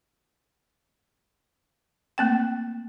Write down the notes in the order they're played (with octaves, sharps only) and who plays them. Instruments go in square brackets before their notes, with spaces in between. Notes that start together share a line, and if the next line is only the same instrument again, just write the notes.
[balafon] A3 A#3 C4 G5